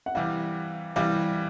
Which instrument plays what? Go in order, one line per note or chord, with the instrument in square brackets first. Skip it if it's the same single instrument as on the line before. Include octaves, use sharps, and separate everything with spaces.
[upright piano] F#5
[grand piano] C3 E3 G3 [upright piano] F5
[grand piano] C3 E3 G3 [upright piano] F5